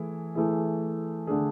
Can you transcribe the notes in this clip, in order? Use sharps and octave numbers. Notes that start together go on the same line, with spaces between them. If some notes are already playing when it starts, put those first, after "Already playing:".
Already playing: E3 A3 E4 G#4
E3 A3 E4 G#4
D3 A3 D4 G#4